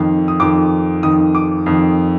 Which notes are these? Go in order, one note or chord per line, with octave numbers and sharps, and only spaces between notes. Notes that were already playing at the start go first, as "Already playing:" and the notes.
Already playing: F2 D#3
D#6
F2 D#3 D6
F2 D#3 D#6
D6
F2 D#3